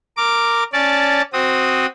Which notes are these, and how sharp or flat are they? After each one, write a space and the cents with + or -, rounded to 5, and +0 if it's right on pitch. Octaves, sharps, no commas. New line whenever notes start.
A#4 -10 D6 +0
C#4 +0 D5 -10 A5 +5
C4 +0 F#4 +0 D#6 +0